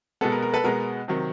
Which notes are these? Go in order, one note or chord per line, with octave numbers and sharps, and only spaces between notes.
B2 G#3 B3 A4
A#4
A#4
A4 B4
B2 G#3 B3 A#4
C3 D#3 F#3